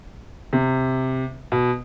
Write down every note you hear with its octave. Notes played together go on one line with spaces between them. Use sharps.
C3
B2